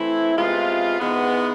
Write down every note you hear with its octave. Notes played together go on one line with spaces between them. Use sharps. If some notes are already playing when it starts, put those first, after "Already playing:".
Already playing: E3 A3 C4 E4
C3 G#3 B3 F4
G#2 E3 G#3 B3